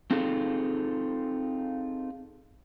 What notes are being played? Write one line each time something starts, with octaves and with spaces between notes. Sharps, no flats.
C4 D#4 F4 G#4 A4